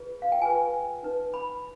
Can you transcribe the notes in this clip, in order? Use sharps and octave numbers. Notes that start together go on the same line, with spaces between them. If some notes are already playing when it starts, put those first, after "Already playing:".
Already playing: F4 G#4 B4
F5
G5
F4 G#4 B4 G#5
D#4 B4
B5